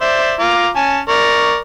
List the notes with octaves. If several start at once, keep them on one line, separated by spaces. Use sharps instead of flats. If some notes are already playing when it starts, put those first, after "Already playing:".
C5 D5 E5
F4 A#5 D6
C#4 G#5 A5
A#4 D5 C#6